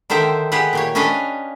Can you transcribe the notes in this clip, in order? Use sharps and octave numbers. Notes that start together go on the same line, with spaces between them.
D3 D#3 C5 E5 G5
G4 G#4 B4 F#5
A#2 G4 C#5
C#4 D4 B4 C#5 D#5 F5